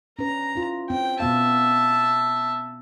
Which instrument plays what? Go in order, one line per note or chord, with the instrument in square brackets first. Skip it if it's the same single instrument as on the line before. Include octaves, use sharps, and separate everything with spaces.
[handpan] C#4 D4 B4 [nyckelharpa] A#5
[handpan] E4 F4
[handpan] C4 [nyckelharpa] G5
[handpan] B2 B3 F5 [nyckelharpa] E5 A5